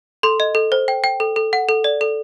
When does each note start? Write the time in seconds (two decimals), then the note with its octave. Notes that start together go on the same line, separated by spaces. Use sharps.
0.23 A4 C6
0.40 D#5
0.55 A4
0.72 C5
0.88 G5
1.04 G5
1.20 A4
1.36 A4
1.53 F#5
1.69 A4
1.84 D5
2.01 A4